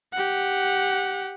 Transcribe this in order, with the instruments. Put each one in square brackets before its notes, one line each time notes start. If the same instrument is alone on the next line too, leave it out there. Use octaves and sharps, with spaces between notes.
[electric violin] G4 F#5